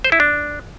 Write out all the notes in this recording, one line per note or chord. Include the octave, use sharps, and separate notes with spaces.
C5
E4
D4